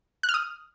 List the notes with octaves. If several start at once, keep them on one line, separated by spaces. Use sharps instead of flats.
F#6
F6
D#6